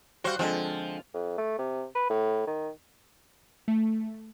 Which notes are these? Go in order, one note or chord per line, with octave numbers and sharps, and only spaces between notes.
G3 F#4 C5 F5
D3 F3 G#3 C4
F2
A3
C3
B4
A2
D#3
A3